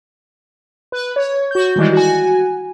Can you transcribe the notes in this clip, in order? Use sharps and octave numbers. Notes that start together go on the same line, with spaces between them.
B4
C#5
F#4 G6
D#3 E3 G3 G#3 E4
F#4 G#5